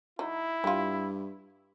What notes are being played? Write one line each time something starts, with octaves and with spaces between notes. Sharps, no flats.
F#3 D#4 E4
G2 G3 F4